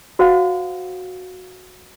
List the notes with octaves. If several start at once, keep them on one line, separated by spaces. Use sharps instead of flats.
F#4 C5 F5 F#5